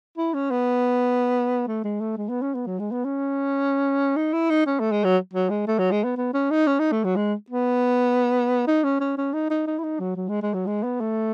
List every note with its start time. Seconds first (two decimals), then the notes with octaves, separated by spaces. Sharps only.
0.17 E4
0.34 C#4
0.51 B3
1.68 A3
1.84 G#3
2.01 A3
2.17 G#3
2.29 B3
2.42 C#4
2.55 B3
2.67 F#3
2.80 G#3
2.92 B3
3.05 C#4
4.16 D#4
4.33 E4
4.50 D#4
4.67 C#4
4.80 A3
4.91 G#3
5.04 F#3
5.33 F#3
5.50 G#3
5.68 A3
5.79 F#3
5.91 G#3
6.04 B3
6.17 B3
6.34 C#4
6.51 D#4
6.67 C#4
6.79 D#4
6.92 A3
7.04 F#3
7.16 G#3
7.50 B3
8.67 D#4
8.84 C#4
9.00 C#4
9.18 C#4
9.34 D#4
9.51 D#4
9.67 D#4
9.79 E4
9.84 D#4
10.00 F#3
10.16 F#3
10.29 G#3
10.43 G#3
10.54 F#3
10.67 G#3
10.83 B3
11.00 A3